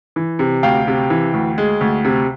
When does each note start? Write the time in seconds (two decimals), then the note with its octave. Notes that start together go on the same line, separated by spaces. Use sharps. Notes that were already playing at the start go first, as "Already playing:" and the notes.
0.16 E3
0.39 C3
0.63 D2 F5 G5
0.87 C3
1.10 E3
1.34 D2
1.58 G#3
1.81 D2
2.05 C3